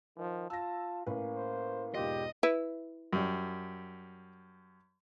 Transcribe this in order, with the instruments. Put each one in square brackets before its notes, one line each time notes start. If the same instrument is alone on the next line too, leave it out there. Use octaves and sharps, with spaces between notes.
[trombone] D#3 [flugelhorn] F3
[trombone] F4 [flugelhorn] A5 [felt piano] E6 A#6
[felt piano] A2 C#4 B4 [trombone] A#3
[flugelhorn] C5
[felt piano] E1 G#2 F4 [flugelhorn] G4 [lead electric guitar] D#5
[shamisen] E4 B4
[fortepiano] F#2 G3